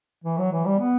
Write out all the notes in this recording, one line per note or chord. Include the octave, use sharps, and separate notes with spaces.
E3
F#3
E3
G3
B3